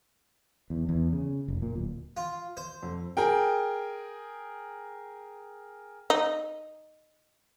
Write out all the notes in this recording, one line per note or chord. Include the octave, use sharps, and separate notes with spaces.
E2
E2
C#3
F1
A#2
D1
F4
C5
F2
G#4 A#4 G5
D#4